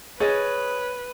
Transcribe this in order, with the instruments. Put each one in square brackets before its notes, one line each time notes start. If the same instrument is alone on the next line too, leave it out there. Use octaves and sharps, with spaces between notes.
[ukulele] G#4 D#5 [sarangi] B4 [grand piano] C#5 A6